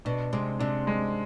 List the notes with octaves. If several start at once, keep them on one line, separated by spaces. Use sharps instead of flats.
B2 D4
C3 G#3
C3 D4
G#3